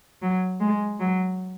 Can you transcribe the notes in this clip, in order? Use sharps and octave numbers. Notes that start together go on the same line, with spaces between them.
F#3
G#3
F#3